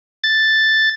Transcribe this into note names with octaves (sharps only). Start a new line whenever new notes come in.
A6